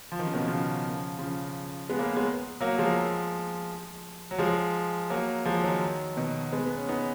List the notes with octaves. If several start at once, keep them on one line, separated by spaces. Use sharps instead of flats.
F3
D#3
C#3
B2 D#3
C#3 F3
C#3 F3
G#3 B3
A#3 C#4
G#3 B3
F#3 A#3
F3 G#3
F#3
F3 G#3
F#3 A#3
F3 G#3
D#3 F#3
B2 D#3
G#3 B3
B3
C#4
B3 D#4